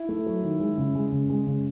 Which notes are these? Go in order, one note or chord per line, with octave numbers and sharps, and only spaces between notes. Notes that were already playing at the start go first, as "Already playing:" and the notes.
Already playing: E4
A3
F#3
D#3
G#3
C#3
G#3
C#3
G#3
C#3